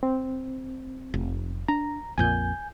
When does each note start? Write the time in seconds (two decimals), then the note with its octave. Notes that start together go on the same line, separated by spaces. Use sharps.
0.03 C4
1.14 F1
1.68 D4 A#5
2.18 A#1 F2 A#2 G#5 G6